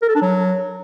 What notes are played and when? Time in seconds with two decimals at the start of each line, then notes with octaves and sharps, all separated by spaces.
0.02 A#4
0.09 A4
0.15 D4
0.22 F#3